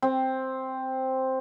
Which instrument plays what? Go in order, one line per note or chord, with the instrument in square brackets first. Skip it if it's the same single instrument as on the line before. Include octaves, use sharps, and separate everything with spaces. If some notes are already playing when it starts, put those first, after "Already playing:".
[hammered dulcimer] C4